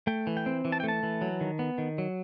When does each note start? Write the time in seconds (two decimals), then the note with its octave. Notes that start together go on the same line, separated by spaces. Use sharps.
0.07 A3 G5
0.27 E3
0.37 G5
0.46 C4
0.65 E3
0.72 A5
0.80 G5
0.83 A3
0.88 A5
1.03 E3
1.22 F#3
1.41 D#3
1.59 B3
1.78 D#3
1.98 F#3